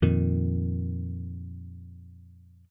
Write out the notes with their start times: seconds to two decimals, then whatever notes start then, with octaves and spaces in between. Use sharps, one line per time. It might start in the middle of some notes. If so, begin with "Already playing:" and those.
0.02 F2 A#2 D#3